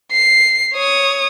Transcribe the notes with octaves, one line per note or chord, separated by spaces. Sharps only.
C7
C#5 D#6